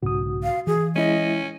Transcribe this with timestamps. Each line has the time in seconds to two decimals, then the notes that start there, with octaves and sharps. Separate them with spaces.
0.03 B1 G#2 C#3 F#4 D#6
0.43 F5
0.67 E3 G#4
0.96 G#3 C#4 E4 D#5